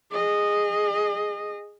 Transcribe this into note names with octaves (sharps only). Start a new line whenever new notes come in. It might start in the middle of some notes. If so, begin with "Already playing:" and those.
G#4 D#5